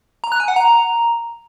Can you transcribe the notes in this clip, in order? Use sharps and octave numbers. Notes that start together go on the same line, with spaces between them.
A#5
F#6
G#5
F#5
A#5